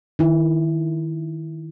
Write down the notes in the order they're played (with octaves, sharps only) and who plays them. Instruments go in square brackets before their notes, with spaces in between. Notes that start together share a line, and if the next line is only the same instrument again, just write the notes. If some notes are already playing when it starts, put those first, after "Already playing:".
[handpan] D#3 E4